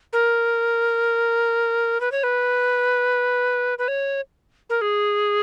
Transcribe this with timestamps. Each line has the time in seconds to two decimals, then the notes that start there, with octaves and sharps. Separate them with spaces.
0.13 A#4
2.00 B4
2.12 C#5
2.23 B4
3.78 B4
3.88 C#5
4.69 A#4
4.81 G#4